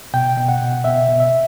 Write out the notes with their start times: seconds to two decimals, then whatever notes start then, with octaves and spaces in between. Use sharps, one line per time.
0.14 B2 G5
0.37 B2
0.49 F#5
0.62 B2
0.84 B2 E5
1.09 B2
1.20 E5